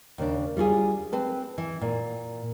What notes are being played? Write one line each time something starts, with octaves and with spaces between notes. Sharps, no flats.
D#2 C#3 D4
G3 F4 F#4 G#4
C4 B4 A5
E3
A#2